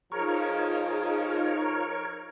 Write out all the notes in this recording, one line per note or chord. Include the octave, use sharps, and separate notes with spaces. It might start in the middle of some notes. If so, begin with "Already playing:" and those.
F3 D#4 F4 G#4 A#4 C#5